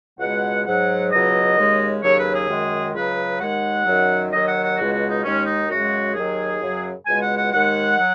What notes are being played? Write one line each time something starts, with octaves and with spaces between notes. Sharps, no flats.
C#2 B2 G#3 F#5
G#2 F#3 F#5
C#2 B2 F#3 D#5
D#2 C#3 G#3
D#2 C#3 F#3 C#5
B4
G#4
F#2 D#3 G#3
C#2 C#3 F#3 B4
D#2 D#3 G#3 F#5
F#2 D#3 F#3
D#2 D#3 F#3 D#5
F#5
F#5
C#2 B2 G#3 F#4
F#4
D#4
D#2 D#3 G#3 C#4
D#4
F#2 C#3 G#3 F#4
D#2 D#3 F#3 G#4
F#2 C#3 F#3
C#2 B2 G#3 G#5
F#5
F#5
D#2 D#3 G#3 F#5
F#3